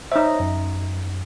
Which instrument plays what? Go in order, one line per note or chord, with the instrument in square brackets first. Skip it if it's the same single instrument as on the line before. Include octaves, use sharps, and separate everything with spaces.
[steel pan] D#4 E5 [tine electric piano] C5 C#5
[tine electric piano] F#2